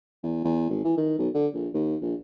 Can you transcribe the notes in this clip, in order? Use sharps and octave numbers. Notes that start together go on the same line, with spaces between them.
E2
E2
G#1
E3
D#3
B1
D3
A#1
D#2
A#1